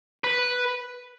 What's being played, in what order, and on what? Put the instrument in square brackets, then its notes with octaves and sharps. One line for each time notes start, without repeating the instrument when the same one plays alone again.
[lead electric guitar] B4